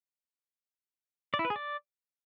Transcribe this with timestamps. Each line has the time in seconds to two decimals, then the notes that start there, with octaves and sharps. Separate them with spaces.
1.34 D5
1.39 E4
1.45 B4
1.50 G#4
1.56 D5